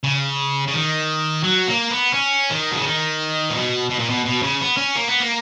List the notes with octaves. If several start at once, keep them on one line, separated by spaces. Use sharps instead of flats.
C#3
C#3
D#3
F#3
A#3
B3
C#4
D#3
B2
C#3
D#3
A#2
B2
B2
A#2
B2
B2
C#3
B3
C#4
A#3
B3
A#3